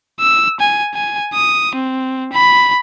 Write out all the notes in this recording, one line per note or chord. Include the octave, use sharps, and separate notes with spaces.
E6
G#5
G#5
D#6
C4
B5